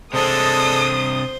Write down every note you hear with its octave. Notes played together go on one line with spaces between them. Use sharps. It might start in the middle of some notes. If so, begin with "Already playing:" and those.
C3 G#3 D4 A4 C5 D#6